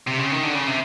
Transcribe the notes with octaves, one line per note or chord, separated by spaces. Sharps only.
C3
C#3
D#3
D3
C#3
C3